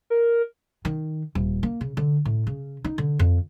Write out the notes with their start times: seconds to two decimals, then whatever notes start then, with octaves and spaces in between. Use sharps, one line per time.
0.10 A#4
0.85 D#3
1.35 D#1
1.63 A#3
1.81 C#3
1.97 D3
2.25 A2
2.47 C#3
2.84 D#4
2.98 D3
3.19 F2